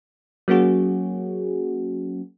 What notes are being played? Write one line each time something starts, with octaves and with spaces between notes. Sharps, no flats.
F#3 A#3 C#4 F#4 G#4